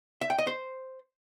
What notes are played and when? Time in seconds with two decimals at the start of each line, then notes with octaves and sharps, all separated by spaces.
0.21 E5
0.30 G5
0.38 D#5
0.47 C5